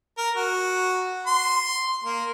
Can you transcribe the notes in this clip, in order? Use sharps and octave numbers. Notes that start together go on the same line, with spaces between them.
A#4
F#4
C6
A#3